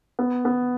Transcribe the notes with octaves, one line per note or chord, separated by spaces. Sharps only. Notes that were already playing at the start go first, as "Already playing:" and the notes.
B3
B3